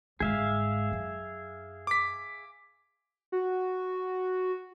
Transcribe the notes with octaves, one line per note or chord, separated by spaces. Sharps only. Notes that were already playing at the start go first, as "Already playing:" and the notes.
G1 G#2 G#4 E5 F5
F#2 D4
D6 B6
F#4